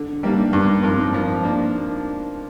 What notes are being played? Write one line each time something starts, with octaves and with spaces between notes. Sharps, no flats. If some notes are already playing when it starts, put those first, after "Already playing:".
Already playing: D3
G3 A#3 D4
G2
F3 C4 A#4
F3
A#3 D4